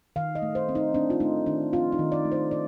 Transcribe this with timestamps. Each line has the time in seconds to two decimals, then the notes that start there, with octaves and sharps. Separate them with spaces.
0.16 D#3 F5
0.35 D#5
0.42 A3
0.55 C5
0.69 C4
0.75 D#4
0.94 C4 D4
1.10 F4
1.20 A3 D#4
1.46 D#3 D4
1.73 C4 F4
1.92 D#4
1.99 D#3
2.12 D5
2.25 A3
2.32 C5
2.51 D4 D5